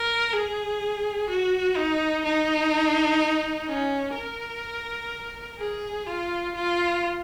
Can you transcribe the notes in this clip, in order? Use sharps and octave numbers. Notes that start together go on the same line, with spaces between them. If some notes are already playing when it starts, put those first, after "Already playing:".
Already playing: A#4
G#4
F#4
D#4
D#4
C#4
A#4
G#4
F4
F4